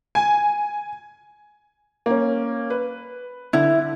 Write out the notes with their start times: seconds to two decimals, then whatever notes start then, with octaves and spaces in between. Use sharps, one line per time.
0.15 G#5
2.06 A#3 C#4
2.70 B4
3.53 D3 E4